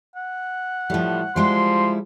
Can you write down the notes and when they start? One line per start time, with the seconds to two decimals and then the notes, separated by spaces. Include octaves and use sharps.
0.16 F#5
0.90 A2 F3 G3
1.36 F3 G3 G#3 E4 C6